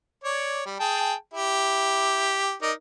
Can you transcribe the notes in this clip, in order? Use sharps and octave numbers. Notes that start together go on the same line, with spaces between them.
C#5 D5
G3
G#4 G5 A5
E4 G4
D#4 A#4 D5